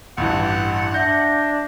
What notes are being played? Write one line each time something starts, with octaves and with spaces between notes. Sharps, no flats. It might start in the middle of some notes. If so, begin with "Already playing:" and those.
A1 G2 E3 F#5
D4 E5 G6 A#6